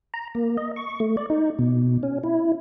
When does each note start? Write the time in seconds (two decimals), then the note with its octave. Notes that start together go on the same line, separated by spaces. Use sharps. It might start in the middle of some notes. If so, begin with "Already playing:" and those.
0.14 A#5
0.35 A#3
0.57 D#5
0.76 C#6
1.00 A3
1.17 D5
1.30 D#4
1.59 B2
2.03 C#4
2.23 E4